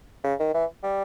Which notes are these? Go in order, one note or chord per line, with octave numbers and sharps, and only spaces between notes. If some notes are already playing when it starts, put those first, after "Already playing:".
C#3
D#3
E3
G3